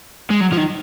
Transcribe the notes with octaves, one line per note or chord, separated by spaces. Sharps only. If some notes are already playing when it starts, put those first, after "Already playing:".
G#3
F#3
F3
D#3